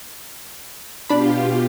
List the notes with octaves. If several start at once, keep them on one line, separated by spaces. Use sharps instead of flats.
B2 D4 F4 G4 B5